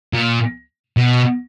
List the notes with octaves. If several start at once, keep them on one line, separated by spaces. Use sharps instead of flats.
A#2
B2